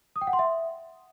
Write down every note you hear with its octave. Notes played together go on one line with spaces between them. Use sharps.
D#6
G5
F#5
C6
E5